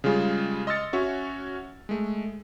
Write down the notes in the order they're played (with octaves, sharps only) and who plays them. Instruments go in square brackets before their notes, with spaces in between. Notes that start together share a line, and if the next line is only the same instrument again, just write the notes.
[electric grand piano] C#3 G3 G#3 F4 G#4
D#5 C6 E6 F6 A6 C#7
C#4 F#4 C#5 E5
G#3 A3